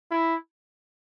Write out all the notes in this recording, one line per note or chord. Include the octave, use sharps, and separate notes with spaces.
E4